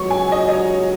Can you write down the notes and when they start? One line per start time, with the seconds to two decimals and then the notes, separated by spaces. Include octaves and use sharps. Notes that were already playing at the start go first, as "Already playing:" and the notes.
Already playing: C#2 B2 F#3 C#6
0.10 G#5
0.32 D#5
0.49 D#5
0.53 C#5